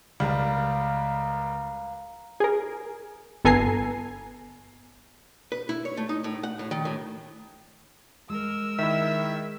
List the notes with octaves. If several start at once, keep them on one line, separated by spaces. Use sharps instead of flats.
C#2 G3 A#4 F5
G#4 A#4
G1 B3 A4 G#5 A#5 C7
B4
E4
C#5
A3
D#4
A2
F#5
A2
D#3
A2
G#3 A#4 E6
D#3 E4 E5